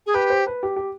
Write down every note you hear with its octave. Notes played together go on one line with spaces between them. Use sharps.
G#4
G4 B4
C5
B4
G4
G4